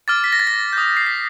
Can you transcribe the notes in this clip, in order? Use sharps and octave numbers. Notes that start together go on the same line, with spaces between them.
D6 F6 A6
B6
A#6
A6
A#6
D#6 G6
C7
B6